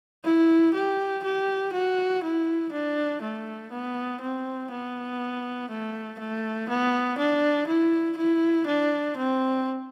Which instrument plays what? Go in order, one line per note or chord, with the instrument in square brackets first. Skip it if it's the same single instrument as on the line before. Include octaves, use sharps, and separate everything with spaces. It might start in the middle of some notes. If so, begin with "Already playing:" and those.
[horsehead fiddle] E4
G4
G4
F#4
E4
D4
A3
B3
C4
B3
A3
A3
B3
D4
E4
E4
D4
C4